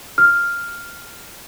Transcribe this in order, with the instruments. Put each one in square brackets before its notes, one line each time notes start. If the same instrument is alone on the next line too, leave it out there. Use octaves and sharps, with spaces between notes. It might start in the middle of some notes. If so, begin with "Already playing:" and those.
[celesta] F6